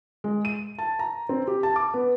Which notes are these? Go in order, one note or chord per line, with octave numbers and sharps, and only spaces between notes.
G#3
D#7
A5
A#5
C4
G4
A5
D6
B3